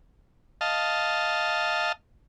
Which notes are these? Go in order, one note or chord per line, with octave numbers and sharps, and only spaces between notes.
D#5 F5 A5